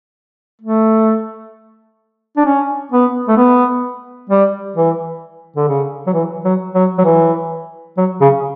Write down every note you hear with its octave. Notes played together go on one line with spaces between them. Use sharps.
A3
D4
C#4
B3
A3
B3
G3
E3
D3
C#3
F#3
E3
F#3
F#3
F#3
E3
F#3
C#3